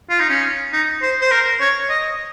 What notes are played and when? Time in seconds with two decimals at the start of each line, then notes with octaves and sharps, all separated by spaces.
0.10 F4
0.20 D#4
0.30 C#4
0.73 D#4
1.02 C5
1.21 C5
1.31 A#4
1.60 C#5
1.90 D#5